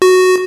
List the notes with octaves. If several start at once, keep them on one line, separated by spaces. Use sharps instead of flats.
F#4